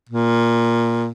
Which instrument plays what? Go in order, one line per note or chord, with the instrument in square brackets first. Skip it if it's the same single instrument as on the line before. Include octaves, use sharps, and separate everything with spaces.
[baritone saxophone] A#2